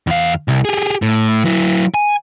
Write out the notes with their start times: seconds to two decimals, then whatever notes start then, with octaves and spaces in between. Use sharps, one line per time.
0.07 E2 F5
0.48 C2
0.65 G4 G#4
1.02 A2
1.45 F#3 E4
1.94 G#5